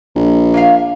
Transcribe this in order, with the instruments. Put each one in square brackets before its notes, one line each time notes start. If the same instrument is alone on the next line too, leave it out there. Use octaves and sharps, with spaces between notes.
[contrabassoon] A#1
[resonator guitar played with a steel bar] A#3 E5 F5